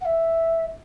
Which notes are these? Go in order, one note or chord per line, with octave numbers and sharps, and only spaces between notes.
F#5
E5